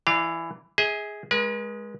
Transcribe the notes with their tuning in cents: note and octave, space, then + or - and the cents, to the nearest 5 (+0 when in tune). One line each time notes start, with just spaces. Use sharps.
E3 +10 D5 +35 F5 -20
G#4 +0 E5 -45
G#3 +0 B4 -45